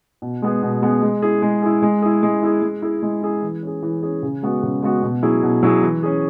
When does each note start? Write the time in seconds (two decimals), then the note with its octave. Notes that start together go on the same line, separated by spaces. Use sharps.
0.22 B2
0.42 G#3 B3 G#4
0.63 B2
0.82 G#3 B3 G#4
1.02 G#3
1.22 E4 G#4
1.42 G#3
1.62 E4 G#4
1.82 G#3
2.02 E4 G#4
2.23 G#3
2.43 E4 G#4
2.62 G#3
2.82 E4 G#4
3.02 G#3
3.23 E4 G#4
3.42 E3
3.63 C#4 G#4
3.83 E3
4.03 C#4 G#4
4.23 C#3
4.43 G#3 B3 F#4
4.63 C#3
4.83 G#3 B3 F#4
5.02 B2
5.23 F#3 E4 G#4
5.43 B2
5.63 F#3 E4 G#4
5.83 E3
6.03 C#4 G#4